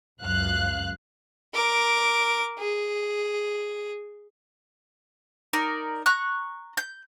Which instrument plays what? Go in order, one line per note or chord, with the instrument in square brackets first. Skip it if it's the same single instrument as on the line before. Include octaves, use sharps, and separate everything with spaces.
[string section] C#2 F#2 F5 F#6
[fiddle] A#4 D6
G#4
[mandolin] D#4 A#4 D5
A#5 C#6 F#6
G6